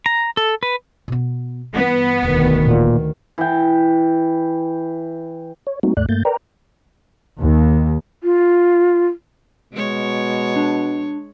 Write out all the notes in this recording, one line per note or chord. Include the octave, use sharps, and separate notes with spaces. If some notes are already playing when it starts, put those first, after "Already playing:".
A#5
A4
B4
B2 B3
G2 E3 B3
E1 D2 D#3
A#2
E3 G5
C#5
G3 A3 A#3 C4 D#4 F#4
D#2 G#2 A3 D5 F#6
G2 A3 A#3 G6 A6
A#4 B4 D5 G5 A#5
D#2
F4
B2 G#3 C#5
D4